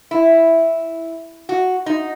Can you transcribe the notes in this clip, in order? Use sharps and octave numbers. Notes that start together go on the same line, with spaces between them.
E4
F#4
D#4